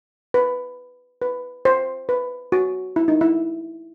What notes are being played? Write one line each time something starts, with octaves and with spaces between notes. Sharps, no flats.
B4
B4
C5
B4
F#4
E4
D#4
E4